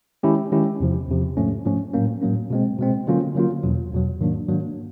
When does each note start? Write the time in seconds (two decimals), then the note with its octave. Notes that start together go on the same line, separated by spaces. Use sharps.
0.23 D#3 G#3 C#4 E4 G4
0.52 D#3 G#3 C#4 E4 G4
0.80 E2 C3 F3
1.08 E2 C3 F3
1.37 G#2 F3 A3 C#4
1.65 G#2 F3 A3 C#4
1.94 A2 F#3 A#3 C#4
2.22 A2 F#3 A#3 C#4
2.50 B2 G#3 C4
2.79 B2 G#3 C4
3.07 D3 F#3 A#3 C#4 F4
3.35 D3 F#3 A#3 C#4 F4
3.63 E2 B2 F#3
3.92 E2 B2 F#3
4.20 G#2 D#3 F#3 A#3 D4
4.49 G#2 D#3 F#3 A#3 D4